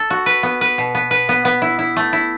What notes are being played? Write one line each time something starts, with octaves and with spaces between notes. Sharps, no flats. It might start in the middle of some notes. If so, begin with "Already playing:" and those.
Already playing: A4
F#4
B4
B3
B4
B2
B3
B4
B3
B3
E4
E4
A3
E4